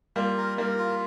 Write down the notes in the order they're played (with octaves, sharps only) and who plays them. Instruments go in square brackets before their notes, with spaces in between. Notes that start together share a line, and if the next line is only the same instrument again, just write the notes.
[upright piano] G3 A#3 [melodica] F4
[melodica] A#4
[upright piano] G3 A#3 [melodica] A#4
[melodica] F4